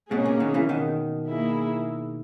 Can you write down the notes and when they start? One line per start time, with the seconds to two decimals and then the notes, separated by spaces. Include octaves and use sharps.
0.11 G#2 B2 A#3 C#4 G#4
0.26 A#2 C#3
0.40 B2 D#3
0.54 C#3 E3
0.69 B2 D#3
1.27 A#3 E4 G#4